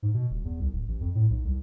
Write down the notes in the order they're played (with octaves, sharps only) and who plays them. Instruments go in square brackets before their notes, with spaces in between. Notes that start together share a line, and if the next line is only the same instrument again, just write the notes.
[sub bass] G#2
B2
D#1
E2
C2
D1
A1
F2
A2
B1
C2